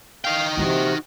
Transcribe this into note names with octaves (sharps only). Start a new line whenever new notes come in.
D#4 F5 G5
C3 E3 A#3 F#4